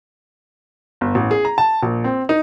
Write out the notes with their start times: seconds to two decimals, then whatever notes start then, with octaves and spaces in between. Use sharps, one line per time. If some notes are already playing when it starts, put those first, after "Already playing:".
1.01 G1
1.15 A1
1.31 G#4
1.45 A#5
1.58 A5
1.83 A#1
2.04 C4
2.29 D#4